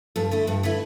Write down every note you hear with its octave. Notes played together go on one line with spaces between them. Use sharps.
G2 A4
D3 A3 E4
G2 A4
D3 A3 E4 B4